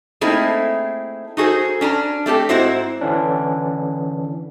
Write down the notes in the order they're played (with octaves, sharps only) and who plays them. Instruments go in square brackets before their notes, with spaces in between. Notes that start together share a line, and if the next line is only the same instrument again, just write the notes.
[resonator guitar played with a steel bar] A3 A#3 C4 D#4 E4 G#4
D#4 F#4 G#4 A4 C5
C#4 D4 G#5 A#5
A3 C4 G4 A4
G#2 C4 E4 F#4 C5
[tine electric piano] D3 E3 C#4 D4